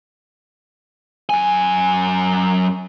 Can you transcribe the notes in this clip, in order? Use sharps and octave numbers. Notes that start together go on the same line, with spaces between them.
F#2 G#5